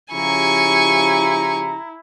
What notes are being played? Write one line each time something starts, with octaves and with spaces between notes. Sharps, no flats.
C#3 F3 E4 G4 G#5 A#5 C#6